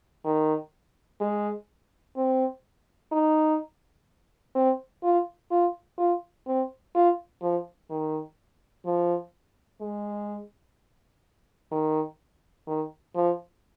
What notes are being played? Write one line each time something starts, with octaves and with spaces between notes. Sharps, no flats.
D#3
G#3
C4
D#4
C4
F4
F4
F4
C4
F4
F3
D#3
F3
G#3
D#3
D#3
F3